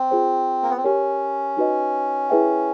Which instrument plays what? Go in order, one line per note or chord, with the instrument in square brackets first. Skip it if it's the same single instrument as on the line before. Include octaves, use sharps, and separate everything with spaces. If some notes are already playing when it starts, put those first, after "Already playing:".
Already playing: [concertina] C4
[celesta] F4 G#4 C5
[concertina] A#3
B3
C4
[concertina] C#4 [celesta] G4 A#4 C#5
[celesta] D#4 F#4 B4 D#5
E4 G#4 B4 E5 G5